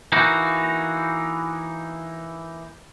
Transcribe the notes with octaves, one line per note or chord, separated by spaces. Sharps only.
E3 A#3 D#4 F#4